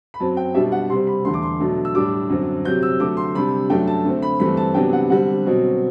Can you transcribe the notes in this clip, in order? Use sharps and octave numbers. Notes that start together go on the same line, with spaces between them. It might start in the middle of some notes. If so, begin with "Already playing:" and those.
B5
F#2 F#3 C4 A5
G5
B2 G3 D4 E5
F#5
C3 G3 C4 C6
B5
E2 D3 A3 C6
D6
C6
B2 F#3 A3 D4
E6
A2 G3 D4 D6
F#2 D3 F#3 C4
C3 F#3 C4 G6
E6
D3 F#3 A3 D6
C6
C3 G3 D4 B5
F#2 F#3 A3 D4 G5
A5
D3 A3 C4
B5
G2 E3 A3 C4 B5
A5
C3 F#3 B3 D4 G5
F#5
D3 G3 C4 F#5
B2 F#3 C4